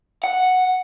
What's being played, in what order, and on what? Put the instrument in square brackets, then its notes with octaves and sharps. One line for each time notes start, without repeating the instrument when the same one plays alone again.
[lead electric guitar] F#5